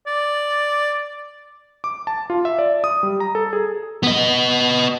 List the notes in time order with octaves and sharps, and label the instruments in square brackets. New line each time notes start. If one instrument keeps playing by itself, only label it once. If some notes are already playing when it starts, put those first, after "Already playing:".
[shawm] D5
[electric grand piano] D6
A5
F4
E5
D5
D#6
G3
A#5
A4
G#4
[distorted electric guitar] B3 D#5